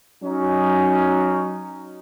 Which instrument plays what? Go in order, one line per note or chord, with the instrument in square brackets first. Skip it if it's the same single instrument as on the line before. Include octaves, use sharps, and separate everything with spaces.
[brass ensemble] F#3 C#4 D#4